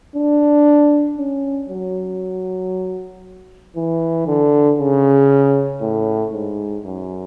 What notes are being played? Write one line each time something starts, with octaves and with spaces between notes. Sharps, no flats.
D4
C#4
F#3
E3
D3
C#3
A2
G#2
F#2